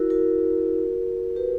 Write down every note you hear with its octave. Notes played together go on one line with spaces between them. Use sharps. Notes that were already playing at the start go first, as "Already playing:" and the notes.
Already playing: E4 F#4 A#4
F#4 A#4
G4 B4